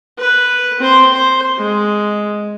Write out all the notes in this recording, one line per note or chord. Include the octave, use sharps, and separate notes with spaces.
B4
C4 C5
C5
G#3